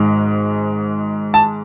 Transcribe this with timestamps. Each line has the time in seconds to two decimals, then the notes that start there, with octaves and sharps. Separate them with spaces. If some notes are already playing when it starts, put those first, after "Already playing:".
Already playing: G#1 G#2 G#3
1.34 A5